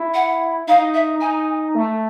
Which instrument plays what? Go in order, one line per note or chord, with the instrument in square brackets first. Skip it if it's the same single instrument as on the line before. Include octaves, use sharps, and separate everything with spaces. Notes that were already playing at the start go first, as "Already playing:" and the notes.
Already playing: [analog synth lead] E4
[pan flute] F#5
[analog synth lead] D#4 [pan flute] F5
[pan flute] E5
[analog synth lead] D#4 [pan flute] G#5
[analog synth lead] A3